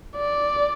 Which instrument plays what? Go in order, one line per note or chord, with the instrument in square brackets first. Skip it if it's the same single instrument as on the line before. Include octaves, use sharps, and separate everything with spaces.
[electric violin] D5